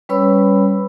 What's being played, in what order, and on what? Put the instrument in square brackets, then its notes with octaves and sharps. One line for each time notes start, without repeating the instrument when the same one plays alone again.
[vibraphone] G3 C#4 B4 C#5 B5 E6